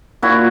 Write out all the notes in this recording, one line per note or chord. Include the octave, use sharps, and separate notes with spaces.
A#2 E4 F#4